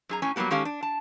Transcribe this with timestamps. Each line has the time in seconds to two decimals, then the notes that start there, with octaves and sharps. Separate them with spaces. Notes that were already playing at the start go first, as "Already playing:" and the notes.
0.09 F#2 G#4 A#5
0.22 A2 C#4 G#5
0.36 F#3 G3 A#3 B3 G4
0.51 D#3 G#3 C#4 G4 A4 F5
0.65 D4
0.83 A5